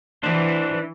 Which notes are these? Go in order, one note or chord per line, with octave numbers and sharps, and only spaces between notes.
E3 D4 C5